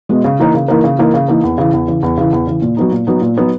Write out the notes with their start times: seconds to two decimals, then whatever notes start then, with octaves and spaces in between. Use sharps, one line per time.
0.09 B2 G#3 B3
0.24 C#3
0.39 E3 A#3 D#4 A#4
0.54 C#3
0.68 E3 A#3 D#4 A#4
0.84 C#3
0.99 E3 A#3 D#4 A#4
1.14 C#3
1.28 E3 A#3 D#4 A#4
1.43 E2
1.58 C#3 E3
1.73 E2
1.88 C#3 E3
2.03 E2
2.17 C#3 E3
2.32 E2
2.47 C#3 E3
2.62 A#2
2.77 F#3 B3 D#4
2.92 A#2
3.07 F#3 B3 D#4
3.22 A#2
3.37 F#3 B3 D#4